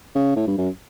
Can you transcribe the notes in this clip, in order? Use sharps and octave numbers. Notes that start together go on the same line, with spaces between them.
C#3
A2
G2
F#2